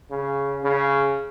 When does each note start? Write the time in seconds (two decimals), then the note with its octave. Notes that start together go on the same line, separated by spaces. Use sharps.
0.10 C#3
0.64 C#3